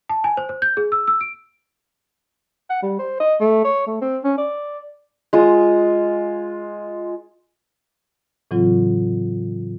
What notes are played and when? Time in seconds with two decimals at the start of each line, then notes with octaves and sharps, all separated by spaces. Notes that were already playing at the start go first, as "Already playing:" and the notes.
0.09 A5
0.24 G#5
0.37 C5
0.49 C5
0.62 G6
0.77 G#4
0.92 E6
1.08 E6
1.21 D7
2.70 F#5
2.83 G3
2.99 C5
3.20 D#5
3.40 A3
3.64 C#5
3.87 A3
4.01 C4
4.23 C#4
4.38 D5
5.33 G#3 F4 D#6
8.51 A2 C#3 E3 F#3 C4 F4